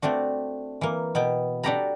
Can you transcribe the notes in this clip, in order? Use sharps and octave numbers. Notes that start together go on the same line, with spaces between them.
A3 C4 D4 F#4
E3 A#3
B2 B3 G5
D4 F#4 G4 A4 A#5 B5